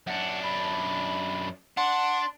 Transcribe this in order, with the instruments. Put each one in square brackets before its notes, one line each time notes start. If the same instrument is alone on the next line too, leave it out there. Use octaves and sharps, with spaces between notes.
[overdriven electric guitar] F#2 D4 [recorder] F#5
[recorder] B5
[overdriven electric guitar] D4 [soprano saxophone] F#5 [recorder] C6